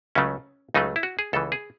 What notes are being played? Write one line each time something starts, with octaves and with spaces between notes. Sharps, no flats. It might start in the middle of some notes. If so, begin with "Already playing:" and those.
C#2 C#3 F#3 A3 C#4
C#2 C#3 F#3 A3 D#4
E4
F#4
G#4
C#2 C#3 E3 A4
G#4